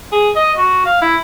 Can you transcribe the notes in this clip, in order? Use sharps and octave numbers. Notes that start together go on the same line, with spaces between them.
G#4
D#5
F#4
F5
E4